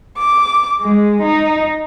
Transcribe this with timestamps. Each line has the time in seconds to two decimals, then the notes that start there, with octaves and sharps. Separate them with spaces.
0.19 D6
0.81 G#3
1.23 D#4